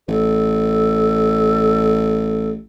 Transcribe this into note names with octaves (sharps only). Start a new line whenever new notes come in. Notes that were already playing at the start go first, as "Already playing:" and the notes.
A1 A4